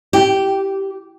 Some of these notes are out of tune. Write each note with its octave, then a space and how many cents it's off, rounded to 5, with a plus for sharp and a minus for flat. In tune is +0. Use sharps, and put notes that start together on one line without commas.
G4 -10